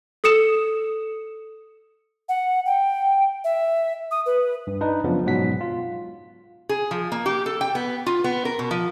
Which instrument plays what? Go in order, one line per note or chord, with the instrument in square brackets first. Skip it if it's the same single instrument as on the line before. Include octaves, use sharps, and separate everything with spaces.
[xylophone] A4 D#6 C#7 E7
[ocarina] F#5
G5
E5
D#6
B4
[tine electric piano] G2
D4 D#4 B4
F#2 C#3 F3 B3 D4
G#2 B2 F#3 F#5 B6
F4
[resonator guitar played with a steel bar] G#4
F3
A#3
G4
A4
G5
B3
F4
B3
A#4
B2
F3